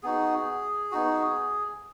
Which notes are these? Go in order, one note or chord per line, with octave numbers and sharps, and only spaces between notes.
B3 D#4 F#4 G#4
B3 D#4 F#4